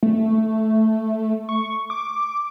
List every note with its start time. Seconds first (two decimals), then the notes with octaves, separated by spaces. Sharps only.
0.03 A3
1.49 C#6
1.90 D6